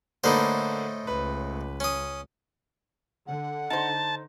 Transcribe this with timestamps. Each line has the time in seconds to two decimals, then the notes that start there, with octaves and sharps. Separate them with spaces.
0.24 A2 D3 A#3 D#4 B4 C5
1.07 C#2 B4
1.80 C#4 D#6
3.27 D3 F#5
3.70 D#4 C5 A5